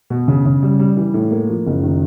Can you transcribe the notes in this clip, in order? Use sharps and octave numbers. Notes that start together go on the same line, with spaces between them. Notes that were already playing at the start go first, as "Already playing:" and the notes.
B2
C#3
C#3
G3
G3
E3
A2
A#3
F3
F#1
D#3